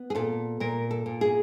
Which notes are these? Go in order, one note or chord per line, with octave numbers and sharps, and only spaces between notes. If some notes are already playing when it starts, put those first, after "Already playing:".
Already playing: B3
G#4
A#2 A4
A#2 A#4
A4
A#2
G#4